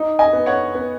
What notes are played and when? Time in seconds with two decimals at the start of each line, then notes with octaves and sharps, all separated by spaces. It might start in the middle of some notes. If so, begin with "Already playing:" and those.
Already playing: D#4
0.19 D#5 G#5
0.33 B3
0.46 C#5 F#5
0.75 B3